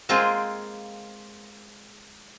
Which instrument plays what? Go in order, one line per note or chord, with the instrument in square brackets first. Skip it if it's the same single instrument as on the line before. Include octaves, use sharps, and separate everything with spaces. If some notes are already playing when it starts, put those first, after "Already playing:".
[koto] G#3 A#3 C4 F4 G#4 G5